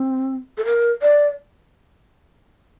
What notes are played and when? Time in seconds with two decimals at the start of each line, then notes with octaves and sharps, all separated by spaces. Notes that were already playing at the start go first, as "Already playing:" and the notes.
Already playing: C4
0.58 A4
0.65 A#4
1.02 D5